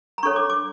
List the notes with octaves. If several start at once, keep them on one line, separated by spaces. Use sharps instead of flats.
A#5
D4 A4 C#5 C#6
D6
D6